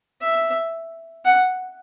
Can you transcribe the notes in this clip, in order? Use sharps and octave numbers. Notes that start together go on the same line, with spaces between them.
E5
F#5